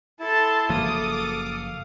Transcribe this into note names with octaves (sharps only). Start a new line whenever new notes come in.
E4 A4 A5 C6
F#1 F3 A#3 A4 F5 D6 D#6